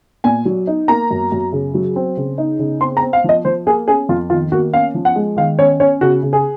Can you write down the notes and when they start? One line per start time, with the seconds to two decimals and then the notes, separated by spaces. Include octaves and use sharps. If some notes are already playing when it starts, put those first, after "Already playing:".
0.24 A#2 G#5
0.45 F#3
0.67 D#4
0.88 A#3 A#5
1.11 F#2
1.32 F#2
1.53 C#3
1.74 F#3
1.96 C4
2.17 C#3
2.38 D#4
2.59 C#3
2.81 C4 C6
2.97 A#5
3.02 C4
3.13 F5
3.24 F3 D#5
3.45 F3 C5
3.67 A#3 G#4
3.88 C#4 G#4
4.09 F2 F4
4.30 D#3 F4
4.52 A#3 F#4
4.73 C#4 F5
4.95 F3
5.05 F#5
5.16 G#3
5.37 D#3 F5
5.59 C#4 C#5
5.80 C#4 C#5
6.01 C#3 F#4
6.23 C#3
6.33 G#4